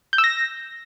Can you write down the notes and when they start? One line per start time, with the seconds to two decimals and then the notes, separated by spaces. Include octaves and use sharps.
0.13 G6
0.18 E6
0.24 A#6